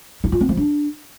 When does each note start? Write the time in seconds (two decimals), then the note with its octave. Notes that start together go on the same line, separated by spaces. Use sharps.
0.24 E4
0.32 F4
0.41 C4
0.49 F3
0.57 D4